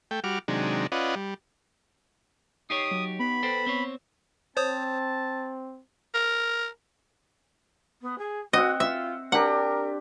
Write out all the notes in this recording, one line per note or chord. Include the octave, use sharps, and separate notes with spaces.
A3 G5
G3 F#4 D6 F6
C3 D#3 F#3 G#3 D4
C#4 F4 B4 D5 D#5 F#5
G3
D#4 G4 C#5 D#6 C7
F#3
B3 B5
A4 C5 G5
C4 C5 C#5
C4 C5 C#5 A5 D#6
A#4
B3
G#4
C4 F#4 D#5 F#5
F4 E5
D4 G4 A#4 F#5